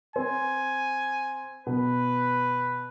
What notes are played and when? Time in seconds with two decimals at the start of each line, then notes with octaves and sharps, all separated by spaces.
0.16 C4 G#5
1.67 B2 B4